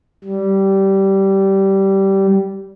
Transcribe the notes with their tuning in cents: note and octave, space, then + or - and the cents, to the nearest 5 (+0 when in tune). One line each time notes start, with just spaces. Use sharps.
G3 -15